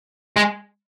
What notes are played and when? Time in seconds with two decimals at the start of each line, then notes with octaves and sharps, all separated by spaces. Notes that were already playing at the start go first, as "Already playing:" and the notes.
0.36 G#3